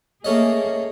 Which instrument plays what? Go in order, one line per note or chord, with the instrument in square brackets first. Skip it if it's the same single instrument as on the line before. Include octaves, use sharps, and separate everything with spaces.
[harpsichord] A3 C#4 D#5 [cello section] A#3 G#4